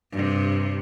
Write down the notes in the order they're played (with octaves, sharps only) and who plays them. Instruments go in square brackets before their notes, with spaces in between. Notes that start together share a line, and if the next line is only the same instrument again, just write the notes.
[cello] G2 C3